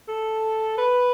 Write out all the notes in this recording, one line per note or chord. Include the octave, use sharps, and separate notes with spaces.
A4
B4